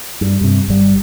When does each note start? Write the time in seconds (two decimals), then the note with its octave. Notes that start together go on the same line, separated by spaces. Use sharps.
0.21 G2
0.41 G2 C3
0.68 G1 G3